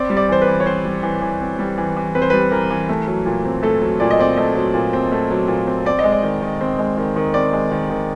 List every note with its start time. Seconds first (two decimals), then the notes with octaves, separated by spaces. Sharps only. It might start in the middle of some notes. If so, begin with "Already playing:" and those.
Already playing: C4 D5
0.10 G3
0.17 D5
0.29 E3 C5
0.42 B4
0.47 E3
0.60 C#5
0.66 C4 C5
0.85 G3
1.03 E3
1.21 E3
1.41 C4
1.59 G3
1.78 E3
1.97 E3
2.15 C4 B4
2.22 C5
2.30 G3 B4
2.51 E3 A#4
2.70 E3
2.89 A3
3.08 F#3
3.26 A#2
3.45 C4
3.63 A3 A4
3.82 F#3
4.00 A#2 D5
4.11 D#5
4.19 C4 D5
4.37 A3 D#5
4.55 F#3
4.74 A#2
4.93 C4
5.12 A3
5.31 F#3
5.48 A#2
5.67 C4
5.85 C4 D5
5.99 D#5
6.04 G#3
6.12 D5
6.23 D#3
6.42 D#3
6.61 C4
6.79 G#3
6.97 D#3
7.16 D#3
7.34 C4 D5
7.53 G#3
7.72 D#3
7.90 D#3